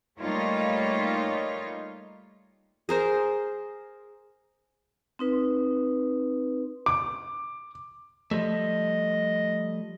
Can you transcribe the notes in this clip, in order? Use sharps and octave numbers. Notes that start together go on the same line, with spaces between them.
G3 A3 A#3 D#4 F4 C#5
G#4 A#4 C5
C4 D#4 B4
D6
F3 G3 A3 D#5